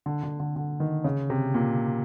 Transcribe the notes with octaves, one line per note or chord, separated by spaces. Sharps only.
D3
D3
D3
D3
D#3
C#3
C3
A#2